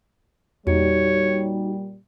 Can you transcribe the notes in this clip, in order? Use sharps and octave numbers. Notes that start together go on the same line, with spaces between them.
E2 A#2 G3 D#4 F#4 C#5